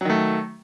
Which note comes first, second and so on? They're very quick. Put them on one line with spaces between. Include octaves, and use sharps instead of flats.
F#3 D#3 A3